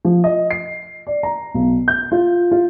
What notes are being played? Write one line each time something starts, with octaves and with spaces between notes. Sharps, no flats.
F3
D#5
C7
D5
A#5
B1
G6
F4
F4